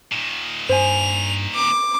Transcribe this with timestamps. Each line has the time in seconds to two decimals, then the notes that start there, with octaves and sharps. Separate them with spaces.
0.12 A#2 D#3
0.69 G2 C5 G#5 F7
1.55 D6